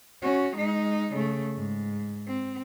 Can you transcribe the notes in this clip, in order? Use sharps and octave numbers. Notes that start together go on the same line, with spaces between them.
C#4 F#4
G#3 D#4
C#3 A3
G#2
C4